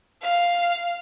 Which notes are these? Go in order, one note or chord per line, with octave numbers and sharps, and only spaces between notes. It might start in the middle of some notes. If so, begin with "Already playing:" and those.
F5